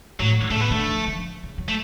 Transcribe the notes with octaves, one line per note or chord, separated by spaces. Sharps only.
A2 F#3
D3
C#3 A3
B3
D3 A3
F3
D3
F3
C#3
F#3
A3